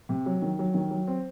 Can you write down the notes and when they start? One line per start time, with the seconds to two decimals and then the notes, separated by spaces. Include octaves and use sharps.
0.09 C3
0.26 F#3
0.42 D#3
0.59 F#3
0.74 D#3
0.91 F#3
1.07 C4